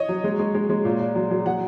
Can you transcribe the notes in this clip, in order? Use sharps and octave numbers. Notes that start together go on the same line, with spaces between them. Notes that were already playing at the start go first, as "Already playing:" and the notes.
Already playing: C#5 D#5
F#3
G#3
G#3
G#3
G#3
A#2
A#2
F#3
F#3
F#3 F#5